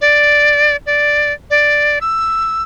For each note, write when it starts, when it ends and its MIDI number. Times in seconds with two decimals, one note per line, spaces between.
0.01 0.76 74
0.86 1.33 74
1.50 1.99 74
2.01 2.63 88